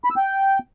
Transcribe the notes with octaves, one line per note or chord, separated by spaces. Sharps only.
B5
E6
G5